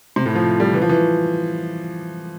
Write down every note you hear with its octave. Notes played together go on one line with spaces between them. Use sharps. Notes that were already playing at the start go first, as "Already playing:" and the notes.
C3
A2
F3
G3
E3
F3
E3